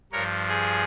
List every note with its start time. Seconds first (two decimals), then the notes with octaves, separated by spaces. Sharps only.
0.12 G2 F3 A#4 C#5
0.49 G#4